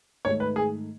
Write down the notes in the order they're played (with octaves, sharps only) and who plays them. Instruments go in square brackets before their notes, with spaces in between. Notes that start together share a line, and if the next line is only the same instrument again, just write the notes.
[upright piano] G#2 D#3 A3 [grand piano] C#5
[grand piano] B4
G#4